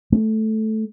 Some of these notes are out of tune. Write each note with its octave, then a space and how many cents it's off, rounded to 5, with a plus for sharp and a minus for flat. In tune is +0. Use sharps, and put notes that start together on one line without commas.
A3 -10